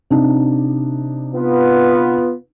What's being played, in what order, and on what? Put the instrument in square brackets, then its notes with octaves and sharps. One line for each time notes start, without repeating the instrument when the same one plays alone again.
[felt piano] C3 D4 D#4
[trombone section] B3 F4